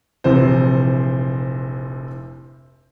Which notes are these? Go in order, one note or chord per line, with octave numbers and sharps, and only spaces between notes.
F1 A#1 C3 E3 C4 C5